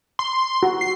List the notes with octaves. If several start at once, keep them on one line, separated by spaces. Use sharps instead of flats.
C6
F#4
C7